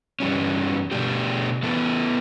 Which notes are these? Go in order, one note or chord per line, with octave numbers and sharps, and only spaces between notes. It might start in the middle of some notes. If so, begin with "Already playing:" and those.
G2 E3 G3 C#4
B2 A3 D4 G4
E3 B3 E4 A4